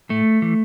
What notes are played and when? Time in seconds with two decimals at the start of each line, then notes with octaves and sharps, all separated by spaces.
0.09 A2 A3
0.42 E3